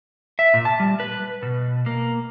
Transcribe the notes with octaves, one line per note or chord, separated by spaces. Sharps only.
E5
A#2
A5
G3
B4
B2
A#3